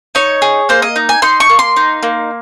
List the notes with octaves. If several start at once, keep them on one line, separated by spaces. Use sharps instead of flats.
D#4 C#5
G#4
A#3 C5
D#5
D#4
G#5
D#4 C6
C#6
A#3
C6
D#4
A#3